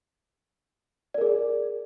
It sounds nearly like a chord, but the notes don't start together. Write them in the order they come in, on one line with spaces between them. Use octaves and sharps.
D5 A#4 G#4